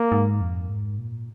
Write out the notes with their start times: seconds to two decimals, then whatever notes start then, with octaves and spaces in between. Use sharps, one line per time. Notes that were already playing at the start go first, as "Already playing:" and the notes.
Already playing: A#3
0.12 G#2
0.41 F2
0.69 G#2
0.98 A#2